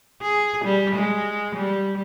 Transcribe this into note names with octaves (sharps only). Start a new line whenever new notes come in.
G#4
G3
G#3
G3